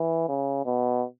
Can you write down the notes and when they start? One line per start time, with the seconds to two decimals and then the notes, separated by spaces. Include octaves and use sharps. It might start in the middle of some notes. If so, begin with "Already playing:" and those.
Already playing: E3
0.29 C#3
0.66 B2